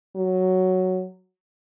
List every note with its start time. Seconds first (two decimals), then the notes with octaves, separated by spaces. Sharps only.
0.16 F#3